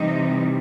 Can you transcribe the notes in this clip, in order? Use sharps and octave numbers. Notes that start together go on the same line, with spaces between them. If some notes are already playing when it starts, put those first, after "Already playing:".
Already playing: C3 E3 G3 D#4